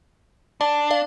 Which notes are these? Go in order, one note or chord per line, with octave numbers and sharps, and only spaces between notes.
D4 D5
D5 F5